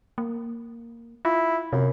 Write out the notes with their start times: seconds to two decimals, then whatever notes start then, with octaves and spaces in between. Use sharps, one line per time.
0.18 A#3
1.25 E4 F4
1.73 F#2 C3